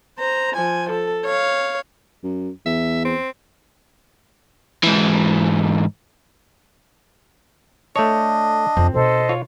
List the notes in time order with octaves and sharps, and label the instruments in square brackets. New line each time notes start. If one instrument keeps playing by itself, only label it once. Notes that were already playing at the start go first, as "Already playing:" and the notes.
[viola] C5 A#5
F3 G#5
A4
C#5 F5
[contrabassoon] F#2
[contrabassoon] E2 [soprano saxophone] E5
[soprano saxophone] C4
[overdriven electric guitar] G#2 E3
[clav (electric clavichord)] A3 C#5 [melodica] D4 D#5
[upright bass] F2 [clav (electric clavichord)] C4
[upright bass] B2 D#4 [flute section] A4 C5 D#5
[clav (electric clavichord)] F4 C#5